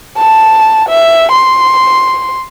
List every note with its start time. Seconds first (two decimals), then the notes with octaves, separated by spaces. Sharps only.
0.18 A5
0.89 E5
1.32 C6